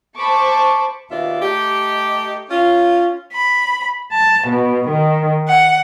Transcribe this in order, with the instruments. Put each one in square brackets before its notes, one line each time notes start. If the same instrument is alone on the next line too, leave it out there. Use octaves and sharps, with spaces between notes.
[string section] C5 A5 B5 C#6 D6
[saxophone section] D#2 B2 F4 D5 E5
A3 D#4 G4
C#4 F4
[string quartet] B5
A5
B2
D#3
F#5